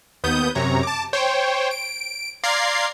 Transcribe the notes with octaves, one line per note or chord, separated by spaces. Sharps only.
D#2 B3 D#6 G6
F#2 C3 C#5 A#5
A5 D6
C5 C#5 G5
D7
D5 F5 A#5 C6 G#6 C7